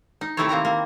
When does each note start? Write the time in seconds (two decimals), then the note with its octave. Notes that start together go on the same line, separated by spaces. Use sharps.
0.21 D#4
0.37 C3 D#3 A3 E4 A4 C#5
0.49 C3 A#3 C4 A#5
0.65 A#3